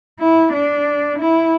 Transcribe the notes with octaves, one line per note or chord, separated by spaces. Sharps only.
E4
D4
E4